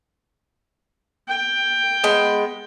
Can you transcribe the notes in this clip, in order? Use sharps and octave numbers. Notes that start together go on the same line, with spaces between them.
G5
G#3 B3